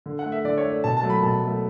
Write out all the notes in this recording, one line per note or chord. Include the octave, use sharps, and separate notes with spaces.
D3
F#5
A3
E5
D3 D5
C#5
A3
D5
B2 A5
A5
F#3 A3
B5
B2 A5
F#3 A3